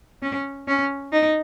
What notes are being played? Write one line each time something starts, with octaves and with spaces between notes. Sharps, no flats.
C#4
C#4
D#4